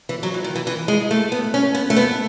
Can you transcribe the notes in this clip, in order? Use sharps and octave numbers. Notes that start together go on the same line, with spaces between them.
E3
F#3
E3
D#3
E3
E3
G#3
A3
B3
C#4
B3
A3
B3